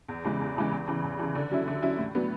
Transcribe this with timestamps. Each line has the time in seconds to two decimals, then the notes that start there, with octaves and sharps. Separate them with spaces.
0.09 E2
0.25 C#3 E3 G#3
0.41 E2
0.56 C#3 E3 G#3
0.72 E2
0.88 C#3 E3
1.04 E2
1.19 C#3 E3
1.35 D3
1.51 F#3 C#4 E4
1.68 D3
1.82 F#3 C#4 E4
1.99 A2
2.15 F#3 B3 D4